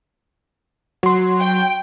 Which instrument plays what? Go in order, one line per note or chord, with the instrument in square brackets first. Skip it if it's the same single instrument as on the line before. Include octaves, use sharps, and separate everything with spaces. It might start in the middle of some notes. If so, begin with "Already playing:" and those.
[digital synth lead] F#3 [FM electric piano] F#4 C6
[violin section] G5